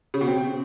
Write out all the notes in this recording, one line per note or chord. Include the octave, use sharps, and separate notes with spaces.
C#3
B2
C4